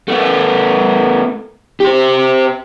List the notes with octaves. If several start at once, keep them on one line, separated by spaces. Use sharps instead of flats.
A3 B3
G4 C5